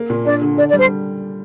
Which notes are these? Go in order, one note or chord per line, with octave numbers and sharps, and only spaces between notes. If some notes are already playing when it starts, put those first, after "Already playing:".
Already playing: A#3
A#2
D4 D5
D3
D3 D5
D5
G3
C5